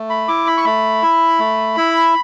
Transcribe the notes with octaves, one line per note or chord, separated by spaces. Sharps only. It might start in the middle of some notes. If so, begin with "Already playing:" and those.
Already playing: A3
B5
E4 D6
B5
C#6
A3 B5
E4
A3
E4